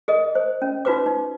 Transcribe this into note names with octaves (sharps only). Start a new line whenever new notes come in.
G#4 A#4 D#5
C5
C#4
D#4 F4 F#4 B4 C5 D6
D#4